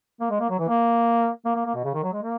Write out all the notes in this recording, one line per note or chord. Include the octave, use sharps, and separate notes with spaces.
A#3
G#3
A#3
F#3
E3
A#3
A#3
A#3
A#3
B2
C#3
D#3
F#3
G#3
A#3